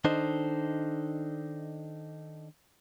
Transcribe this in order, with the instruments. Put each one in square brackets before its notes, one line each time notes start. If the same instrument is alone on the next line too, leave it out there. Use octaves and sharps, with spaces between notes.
[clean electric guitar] D#3 D4 D#4 A4 C5 D#5